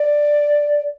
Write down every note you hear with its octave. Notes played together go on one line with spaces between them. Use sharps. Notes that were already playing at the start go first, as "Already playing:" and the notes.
Already playing: D5